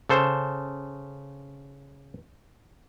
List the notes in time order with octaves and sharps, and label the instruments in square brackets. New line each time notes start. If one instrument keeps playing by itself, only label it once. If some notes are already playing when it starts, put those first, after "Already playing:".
[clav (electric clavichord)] C#3 A4 C5